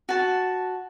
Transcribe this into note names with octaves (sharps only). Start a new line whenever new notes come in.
F#4 A5